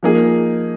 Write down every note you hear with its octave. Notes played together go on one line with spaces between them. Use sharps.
F3 A#3 D#4 G#4